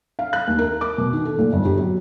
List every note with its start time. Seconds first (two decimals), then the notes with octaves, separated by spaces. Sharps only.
0.19 F5
0.33 F#6
0.47 D#2
0.59 A#4
0.81 D6
0.98 B2
1.13 D#3
1.25 A4
1.39 A#2
1.53 G1
1.65 G4
1.77 F#3